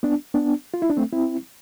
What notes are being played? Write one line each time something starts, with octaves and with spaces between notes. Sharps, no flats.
B3 D4
B3 D4
F4
E4
D4
A3 C4
C4 E4